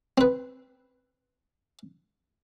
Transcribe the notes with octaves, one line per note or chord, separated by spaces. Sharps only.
C4 B4